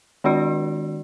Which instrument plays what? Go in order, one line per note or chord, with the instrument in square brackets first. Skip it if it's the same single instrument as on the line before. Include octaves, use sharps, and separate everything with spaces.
[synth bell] D#3 G#3 D4 F#4 D5